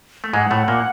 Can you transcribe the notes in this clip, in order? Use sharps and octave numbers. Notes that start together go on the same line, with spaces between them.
A3
G#2 G#3 F#5
A2 A3
A#2 A#3